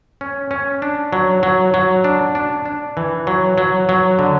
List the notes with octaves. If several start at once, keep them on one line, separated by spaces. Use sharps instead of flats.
C#4
C#4
D4
F#3
F#3
F#3
D4
D4
D4
E3
F#3
F#3
F#3
D3